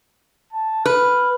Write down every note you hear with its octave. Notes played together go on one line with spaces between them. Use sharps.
A5
B4 F6